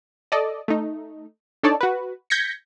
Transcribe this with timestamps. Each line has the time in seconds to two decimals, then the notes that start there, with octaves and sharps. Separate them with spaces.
0.32 A4 D5 D#5
0.68 A3 D#4
1.63 D4 D#4 A4 C#5 D5 A5
1.81 F#4 B4
2.30 G6 G#6 A#6 B6 C#7